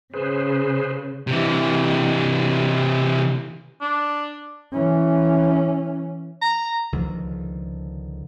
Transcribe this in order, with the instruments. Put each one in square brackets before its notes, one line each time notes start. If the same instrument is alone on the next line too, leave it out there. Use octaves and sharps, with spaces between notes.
[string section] C#3 [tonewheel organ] G#4 B4 C5
[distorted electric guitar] C3 E3
[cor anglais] D4
[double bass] E3 C#4
[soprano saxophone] A#5
[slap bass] C#2 D3 D#3 F3